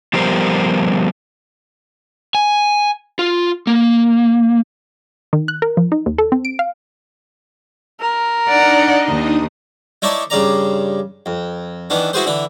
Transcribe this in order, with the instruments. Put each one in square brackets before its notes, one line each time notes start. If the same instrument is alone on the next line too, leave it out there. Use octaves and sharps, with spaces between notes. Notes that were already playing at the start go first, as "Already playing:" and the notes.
[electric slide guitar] F3 G3 B3 G4 A#4 C5
G#5
F4
A#3
[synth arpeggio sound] D#3
F#6
A#4
F3
D#4
D#2
A4
C4
D7
F5
[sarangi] A#4
[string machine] D4 D#4 D#5 [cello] D5 F#5
[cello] D#2
[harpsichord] D#4 E4 C#5 D5 A5
G2 C#3 D5 A#5
F2
D#3 E3 B3 D4
E4 F#4 G#4 B4 C5
D3 E3 E4